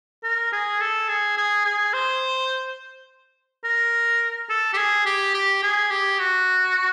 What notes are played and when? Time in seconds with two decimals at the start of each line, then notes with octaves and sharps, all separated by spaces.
0.23 A#4
0.53 G#4
0.81 A4
1.09 G#4
1.38 G#4
1.65 G#4
1.94 C5
3.64 A#4
4.50 A4
4.74 G4
4.78 G#4
5.06 G4
5.34 G4
5.63 G#4
5.91 G4
6.19 F#4